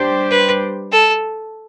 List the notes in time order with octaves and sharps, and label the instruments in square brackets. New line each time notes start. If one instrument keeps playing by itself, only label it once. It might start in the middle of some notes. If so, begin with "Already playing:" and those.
Already playing: [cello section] G3 D4 G4 C5
[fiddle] B4
A4